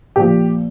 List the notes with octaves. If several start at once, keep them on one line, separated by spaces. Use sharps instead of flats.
A#2 F3 G4